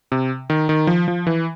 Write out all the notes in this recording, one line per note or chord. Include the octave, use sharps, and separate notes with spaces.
C3
D#3
D#3
F3
F3
E3